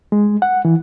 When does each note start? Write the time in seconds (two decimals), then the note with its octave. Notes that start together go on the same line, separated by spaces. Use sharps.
0.12 G#3
0.42 F#5
0.65 E3